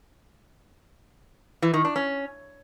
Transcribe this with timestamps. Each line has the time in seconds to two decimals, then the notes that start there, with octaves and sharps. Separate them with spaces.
1.62 E3
1.74 D#3
1.85 D4
1.96 C#4